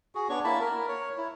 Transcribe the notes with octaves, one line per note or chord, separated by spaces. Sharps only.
F#4 G#4
B3 D4 C#5 C#6
A#3 E4 A5 B5
A#4
C#5
E4